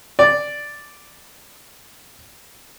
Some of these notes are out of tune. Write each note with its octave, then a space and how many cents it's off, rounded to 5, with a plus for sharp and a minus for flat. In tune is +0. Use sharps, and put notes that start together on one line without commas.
D5 +0